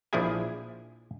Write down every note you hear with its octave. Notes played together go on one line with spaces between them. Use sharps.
A#1 F3 D4 E4 G#4 G#5